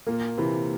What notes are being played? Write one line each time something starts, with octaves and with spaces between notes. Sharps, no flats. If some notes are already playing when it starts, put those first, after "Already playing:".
A#2 A#3
C3 E3